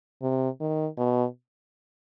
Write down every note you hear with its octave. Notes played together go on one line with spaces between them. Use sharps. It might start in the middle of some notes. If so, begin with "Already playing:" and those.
C3
D#3
B2